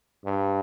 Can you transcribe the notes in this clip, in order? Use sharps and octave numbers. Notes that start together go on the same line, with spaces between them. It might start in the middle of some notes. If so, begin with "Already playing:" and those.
G2